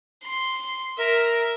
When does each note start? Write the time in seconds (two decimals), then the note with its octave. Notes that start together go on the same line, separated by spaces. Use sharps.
0.23 C6
0.98 A#4 E5